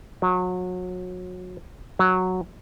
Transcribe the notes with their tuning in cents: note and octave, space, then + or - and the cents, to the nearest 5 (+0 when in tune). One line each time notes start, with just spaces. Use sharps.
F#3 -30
F#3 -5